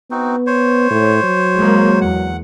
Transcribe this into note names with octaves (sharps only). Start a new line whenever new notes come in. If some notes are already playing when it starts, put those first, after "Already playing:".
B3 C4 D#4 F#4
C5 C#5
A2
F#3
G#3 A#3
E2 F#5